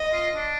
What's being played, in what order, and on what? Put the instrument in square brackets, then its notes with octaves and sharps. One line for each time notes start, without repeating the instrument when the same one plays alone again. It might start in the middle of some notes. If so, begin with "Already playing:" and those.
Already playing: [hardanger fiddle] D#5
[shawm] F4
D4